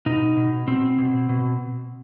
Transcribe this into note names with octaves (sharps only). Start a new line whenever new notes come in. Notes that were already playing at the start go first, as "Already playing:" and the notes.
B2 D#4
B2
B2 C4
B2
B2